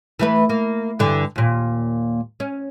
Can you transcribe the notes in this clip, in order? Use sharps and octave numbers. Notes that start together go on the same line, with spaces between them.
E3 A3 B4
A#3
G2 D3 E3
D#2 A#2
C#4